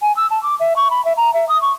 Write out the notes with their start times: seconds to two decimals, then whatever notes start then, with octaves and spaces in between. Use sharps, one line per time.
0.02 G#5
0.16 E6
0.31 A5
0.43 D6
0.60 E5
0.76 C#6
0.90 B5
1.05 E5
1.17 A#5
1.34 E5
1.49 D#6
1.62 C#6